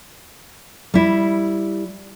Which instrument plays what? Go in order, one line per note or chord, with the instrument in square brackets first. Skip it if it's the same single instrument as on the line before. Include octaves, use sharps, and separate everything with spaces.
[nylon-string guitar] G3 E4